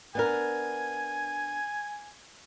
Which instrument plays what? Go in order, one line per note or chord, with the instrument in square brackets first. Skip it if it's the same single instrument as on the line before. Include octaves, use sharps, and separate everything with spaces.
[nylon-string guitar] B3 D4 A#4 [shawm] G#5